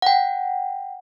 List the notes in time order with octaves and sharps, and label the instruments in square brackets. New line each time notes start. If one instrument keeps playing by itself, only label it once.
[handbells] F#5 G5